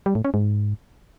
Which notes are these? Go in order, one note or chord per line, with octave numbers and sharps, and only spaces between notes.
G3
A2
C#4
G#2